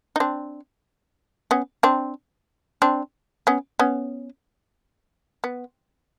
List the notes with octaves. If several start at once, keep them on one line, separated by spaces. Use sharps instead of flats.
D#4
C4 D4
B3 C#4
C4 D4
C4 D4
B3 C#4
B3 C#4
B3